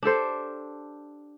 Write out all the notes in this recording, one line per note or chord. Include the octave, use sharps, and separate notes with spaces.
D4 G4 A4 C5